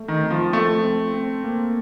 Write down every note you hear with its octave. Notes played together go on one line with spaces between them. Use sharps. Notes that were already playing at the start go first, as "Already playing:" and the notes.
Already playing: A3
D#3
C4
F3
F3 A3
C4
C4
A#3